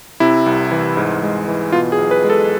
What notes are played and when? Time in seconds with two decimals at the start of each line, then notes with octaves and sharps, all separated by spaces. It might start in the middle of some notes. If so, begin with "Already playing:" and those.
0.20 C3 E4
0.46 C2
0.72 E3
0.97 G#2
1.23 G#3
1.48 E3
1.72 B2 F4
1.92 G#4
1.98 B1
2.11 B4
2.24 G#3
2.30 A4